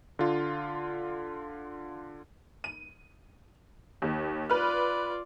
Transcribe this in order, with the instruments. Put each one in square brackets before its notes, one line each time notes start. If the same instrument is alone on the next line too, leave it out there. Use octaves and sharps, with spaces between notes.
[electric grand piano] D3 F4
[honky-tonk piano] D#7
D#2
[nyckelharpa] F4 D5 [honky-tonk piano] B4 F6